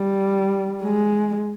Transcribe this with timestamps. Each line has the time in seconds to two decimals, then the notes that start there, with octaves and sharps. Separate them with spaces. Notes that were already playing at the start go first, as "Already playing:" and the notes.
Already playing: G3
0.82 G#3